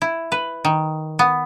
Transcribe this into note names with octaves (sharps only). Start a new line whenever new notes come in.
E4
B4
D#3
B3